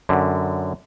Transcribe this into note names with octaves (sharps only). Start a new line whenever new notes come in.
F#2 D3